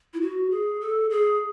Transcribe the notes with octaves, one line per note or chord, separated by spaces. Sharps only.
E4
F#4
G#4
A4
G#4